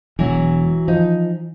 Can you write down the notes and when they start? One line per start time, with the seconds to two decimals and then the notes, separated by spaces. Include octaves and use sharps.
0.19 E1 E3 F#3 F#4
0.88 F3 D#4